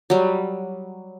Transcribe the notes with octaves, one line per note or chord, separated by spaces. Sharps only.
F#3 G3